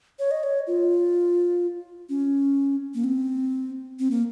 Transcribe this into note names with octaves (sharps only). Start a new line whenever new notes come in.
C#5
D#5
C#5
F4
C#4
A#3
C4
C4
A#3